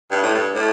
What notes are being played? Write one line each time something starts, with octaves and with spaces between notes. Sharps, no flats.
G2
A2
G2
A2